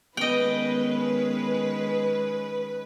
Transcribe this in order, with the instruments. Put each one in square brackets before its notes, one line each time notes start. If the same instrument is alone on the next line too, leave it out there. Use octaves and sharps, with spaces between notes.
[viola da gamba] D#3 G#3 C#4 [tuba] B3 [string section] B4 [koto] D#5 G5